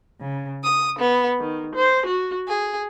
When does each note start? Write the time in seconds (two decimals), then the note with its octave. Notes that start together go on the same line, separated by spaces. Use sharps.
0.20 C#3
0.63 D#6
0.98 B3
1.41 D#3
1.76 C5
2.07 F#4
2.48 G#4